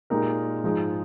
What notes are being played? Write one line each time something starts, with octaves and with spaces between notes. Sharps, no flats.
A#2 G#3 D#4 G4 A#4
G#2 F3 G#3 D#4 G#4